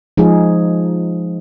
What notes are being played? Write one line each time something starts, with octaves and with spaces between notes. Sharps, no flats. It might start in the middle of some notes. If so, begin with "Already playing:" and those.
F3 G#3 D#4 G#4